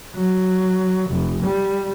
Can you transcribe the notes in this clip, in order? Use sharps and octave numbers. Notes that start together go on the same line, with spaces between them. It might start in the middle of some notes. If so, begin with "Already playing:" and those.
F#3
F1
G3